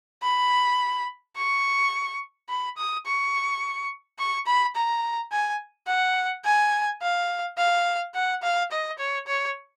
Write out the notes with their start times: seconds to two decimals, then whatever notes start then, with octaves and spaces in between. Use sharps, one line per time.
0.23 B5
1.36 C#6
2.49 B5
2.77 D#6
3.06 C#6
4.19 C#6
4.46 B5
4.76 A#5
5.32 G#5
5.88 F#5
6.45 G#5
7.02 F5
7.58 F5
8.14 F#5
8.43 F5
8.72 D#5
8.99 C#5
9.27 C#5